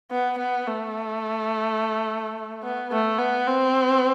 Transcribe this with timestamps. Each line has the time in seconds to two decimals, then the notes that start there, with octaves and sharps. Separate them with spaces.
0.12 B3
0.38 B3
0.67 A3
2.63 B3
2.92 A3
3.19 B3
3.47 C4